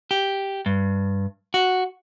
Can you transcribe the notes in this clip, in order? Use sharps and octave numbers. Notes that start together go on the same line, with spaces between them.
G4
G2
F#4